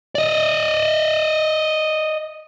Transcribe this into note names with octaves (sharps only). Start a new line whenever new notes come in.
D5 D#5